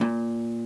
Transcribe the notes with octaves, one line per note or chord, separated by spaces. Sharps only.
A#2